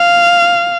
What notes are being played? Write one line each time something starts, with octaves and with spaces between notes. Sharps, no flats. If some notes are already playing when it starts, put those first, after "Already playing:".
Already playing: F5